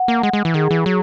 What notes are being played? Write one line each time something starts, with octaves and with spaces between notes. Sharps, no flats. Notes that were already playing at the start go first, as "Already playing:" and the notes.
Already playing: F#5
A#3
G#3
G#3
E3
D#3 G#4
E3
F#3